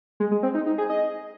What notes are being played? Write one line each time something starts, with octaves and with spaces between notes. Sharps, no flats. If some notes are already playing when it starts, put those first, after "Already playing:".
G#3
G#3
C4
D#4
D#4
G#4
D#5